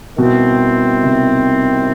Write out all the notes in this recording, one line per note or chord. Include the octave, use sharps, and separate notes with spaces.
B2 D#3 G3 C4 E4
C3